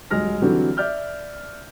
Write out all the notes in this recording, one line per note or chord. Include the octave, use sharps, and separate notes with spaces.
D#1 F#3 G#3 F6 A#6
D3 E3 F#3 G3 C4 F#4
D5 E5 F6 G6